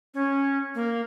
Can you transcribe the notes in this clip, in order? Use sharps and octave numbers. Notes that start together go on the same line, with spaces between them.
C#4
A#3